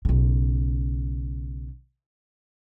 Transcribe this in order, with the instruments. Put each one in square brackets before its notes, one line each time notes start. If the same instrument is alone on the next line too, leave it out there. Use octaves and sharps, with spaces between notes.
[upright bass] B1 C#3